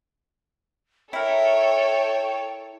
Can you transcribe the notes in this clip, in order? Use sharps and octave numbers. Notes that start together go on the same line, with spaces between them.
E4 A4 A#4 C#5 G5